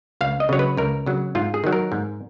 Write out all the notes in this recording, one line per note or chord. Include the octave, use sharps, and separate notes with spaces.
C#2 F5
D#5
C#3 F#3 C#5
B4
C#2 A#4
C#3 F#3
G#2 F4
G#4
D#3 F#3
A#4
G#2